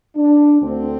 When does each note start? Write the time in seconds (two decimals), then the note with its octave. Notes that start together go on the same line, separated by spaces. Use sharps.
0.17 D4
0.62 D2 D3 C4